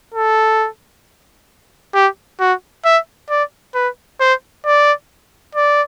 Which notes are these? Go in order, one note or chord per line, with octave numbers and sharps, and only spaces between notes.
A4
G4
F#4
E5
D5
B4
C5
D5
D5